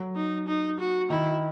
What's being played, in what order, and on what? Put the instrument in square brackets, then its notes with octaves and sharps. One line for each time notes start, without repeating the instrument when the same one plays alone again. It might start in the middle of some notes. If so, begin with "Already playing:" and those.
Already playing: [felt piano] F#3
[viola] D#4
D#4
F#4
[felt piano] D#3 [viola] E4